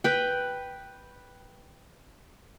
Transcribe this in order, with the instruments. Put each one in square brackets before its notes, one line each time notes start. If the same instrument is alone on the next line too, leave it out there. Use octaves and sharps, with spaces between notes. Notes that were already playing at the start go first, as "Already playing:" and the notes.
[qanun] B4 G5